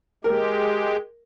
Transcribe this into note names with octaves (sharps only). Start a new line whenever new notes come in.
G#3 G4 A#4